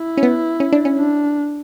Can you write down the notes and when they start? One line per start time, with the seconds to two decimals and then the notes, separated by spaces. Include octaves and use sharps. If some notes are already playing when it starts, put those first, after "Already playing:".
Already playing: E4
0.17 C#4
0.23 B3
0.60 C#4
0.73 D4
0.85 C#4
0.98 D4